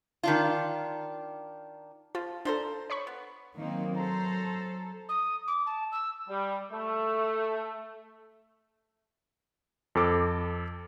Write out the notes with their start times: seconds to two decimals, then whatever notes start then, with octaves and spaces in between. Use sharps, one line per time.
0.23 D#3 D4 F4
2.15 F3 F4
2.45 F3 D4 A4 C5 A#5
2.90 C#5 B5 C#6
3.07 B3
3.57 D#3 F#3 A#3 C4 D#4
3.96 A4 C5 A#5
5.08 D#6
5.47 D6
5.66 A5
5.92 E6
6.29 G3
6.71 A3
9.95 F2 A4 D6